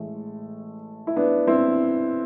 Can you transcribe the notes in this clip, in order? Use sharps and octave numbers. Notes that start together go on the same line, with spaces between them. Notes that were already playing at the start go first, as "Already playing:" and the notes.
Already playing: A1 A2 G#3 A3
E4
B3 D4
C4 E4